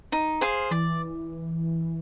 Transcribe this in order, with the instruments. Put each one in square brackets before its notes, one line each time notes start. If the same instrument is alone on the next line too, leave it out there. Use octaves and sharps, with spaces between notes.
[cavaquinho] D#4
G#4 C5 F5
[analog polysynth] E3 [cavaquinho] D5